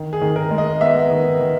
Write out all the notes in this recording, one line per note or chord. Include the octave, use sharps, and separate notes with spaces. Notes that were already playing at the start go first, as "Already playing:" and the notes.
Already playing: D#3
G#4
D#3
A#4
G#3
D#5
B3 E5
D#3
D#3